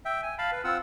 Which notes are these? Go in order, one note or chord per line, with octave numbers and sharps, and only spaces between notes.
E5 G5
G#5
F5 A5 B5
B4
C4 F4 F#5 E6